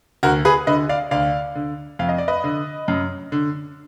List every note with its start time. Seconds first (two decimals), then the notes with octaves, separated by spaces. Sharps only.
0.23 D2 F#4 A#4
0.45 G#4 B4
0.67 D3 B4 D#5
0.89 D5 F5
1.11 D2 D5 F5
1.55 D3
1.99 F2 F5
2.09 D#5
2.18 D5
2.28 B4 D#5
2.44 D3
2.88 F#2
3.32 D3